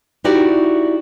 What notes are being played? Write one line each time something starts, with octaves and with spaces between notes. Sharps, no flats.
D#4 E4 F#4 G4 D5 E5